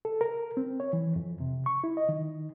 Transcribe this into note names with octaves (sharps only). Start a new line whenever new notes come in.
A4
A#4
C4
C#5
E3
F2
C3
C#6
E4
D#5
D#3